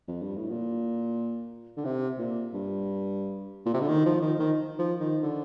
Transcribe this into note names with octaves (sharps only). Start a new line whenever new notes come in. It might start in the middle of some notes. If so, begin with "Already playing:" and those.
F2
G2
A2
A#2
D3
C3
A#2
G2
A#2
C3
D3
D#3
F3
D#3
D#3
F3
D#3
D3